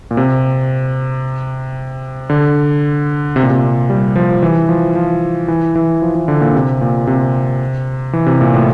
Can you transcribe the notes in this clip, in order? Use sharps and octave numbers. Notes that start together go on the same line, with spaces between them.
A#2
C3
D3
C3
A#2
C3
G3
F3
E3
F3
F3
E3
E3
F3
E3
D3
A#2
C3
A#2
C3
E3
C3
A#2
A2